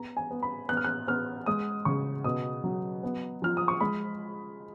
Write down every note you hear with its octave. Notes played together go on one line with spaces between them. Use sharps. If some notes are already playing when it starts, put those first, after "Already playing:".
Already playing: B3 A#5
G#5
B3
B5
B3 F#6
F6
F#6
B3 F6
G#3 D#6
C#3 C#6
B2 D#6
F#3
B3
F3 F6
D#6
C#6
G#3 B5